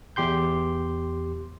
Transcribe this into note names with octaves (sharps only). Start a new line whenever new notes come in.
E2 G4 C6 G6